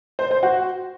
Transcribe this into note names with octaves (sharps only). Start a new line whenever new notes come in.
C5
C5
F#4